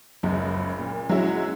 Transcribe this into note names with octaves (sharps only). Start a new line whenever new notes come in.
F#1 C#2 F#2
A#2
F#3 G#3 C#4 E4